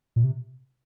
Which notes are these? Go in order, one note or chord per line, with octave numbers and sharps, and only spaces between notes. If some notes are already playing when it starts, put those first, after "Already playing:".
A#2
C3